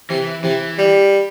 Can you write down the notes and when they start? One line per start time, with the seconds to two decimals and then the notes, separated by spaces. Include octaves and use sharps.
0.10 C3 E3
0.44 C3 E3
0.78 G3